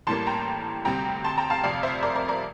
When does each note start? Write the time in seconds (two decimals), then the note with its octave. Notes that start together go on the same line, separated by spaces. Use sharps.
0.07 A1 A2 G3 A#3 A5 C6
0.27 G5 A#5
0.85 D2 C3 G3 C4 G5 A#5
1.24 A5 C6
1.37 G5 A#5
1.50 F5 A5
1.63 F1 F2 C3 D5 F5
1.83 C5 E5
2.03 A#4 D5
2.15 A#4 D5
2.28 A#4 D5